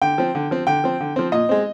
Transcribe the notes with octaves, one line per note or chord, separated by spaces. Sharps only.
D3 G5
F3 C4
D3
F3 C4
D3 G5
F3 C4
D3
F3 C4
A#2 D#5
G#3 C4